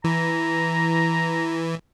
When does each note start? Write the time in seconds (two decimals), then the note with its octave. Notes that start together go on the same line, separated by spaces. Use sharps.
0.04 E3 A#5